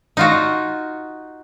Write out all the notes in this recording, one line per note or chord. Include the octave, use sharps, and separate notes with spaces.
D#4 F4 F#4